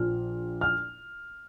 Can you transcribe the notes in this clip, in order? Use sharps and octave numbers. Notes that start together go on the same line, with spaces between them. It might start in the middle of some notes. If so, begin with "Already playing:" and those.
Already playing: A#1 A#2 F3 F6
F6